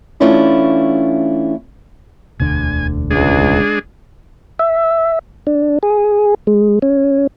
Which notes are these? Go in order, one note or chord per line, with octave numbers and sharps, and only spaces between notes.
E3 A3 C#4 D4 E4 F4
E1 D2 D3 G#5
C#2 G#3 D4 G#4
E5
D4
G#4
G#3
C#4